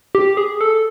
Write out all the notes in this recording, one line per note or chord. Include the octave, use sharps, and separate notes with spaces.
G4
G#4
A4